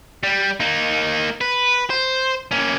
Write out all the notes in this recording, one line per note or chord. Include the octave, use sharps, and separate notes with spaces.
G3
A#3 D#4
B4
C5
A#3 C#4